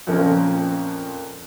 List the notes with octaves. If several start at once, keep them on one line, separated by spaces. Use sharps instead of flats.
F2 A#2 F3 A#3 C#4 A#4